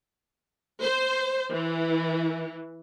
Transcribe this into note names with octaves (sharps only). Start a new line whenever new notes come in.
C5
E3